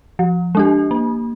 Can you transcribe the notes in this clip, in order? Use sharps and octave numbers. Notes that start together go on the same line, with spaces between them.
F3
G#3 D4 G4
A#3